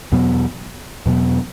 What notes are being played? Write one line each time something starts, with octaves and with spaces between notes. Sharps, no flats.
E2 B2 F#3 B3
E2 B2 F#3 B3